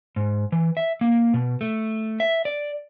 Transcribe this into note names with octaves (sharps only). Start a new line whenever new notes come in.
G#2
E3
E5
A#3
B2
A3
E5
D5